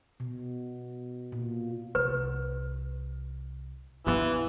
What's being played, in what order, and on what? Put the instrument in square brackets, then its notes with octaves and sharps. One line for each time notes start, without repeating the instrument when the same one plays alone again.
[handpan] B2
A#2
[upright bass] C2 [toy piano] B4
[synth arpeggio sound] G2 F3 B3 [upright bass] B2 [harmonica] E3